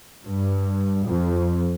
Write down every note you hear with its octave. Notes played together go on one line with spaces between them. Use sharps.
G2
F2